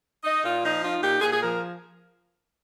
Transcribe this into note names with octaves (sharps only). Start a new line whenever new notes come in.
D#4 D#5
A#2 F4
F3 D#4
D#4 F4
A#2 G4
A#2 G#4
G#4
F3 A#4